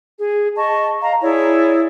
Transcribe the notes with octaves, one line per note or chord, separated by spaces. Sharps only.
G#4
D#5 A5 C#6
D#5 F5 A#5
E4 G#4 C#5 D5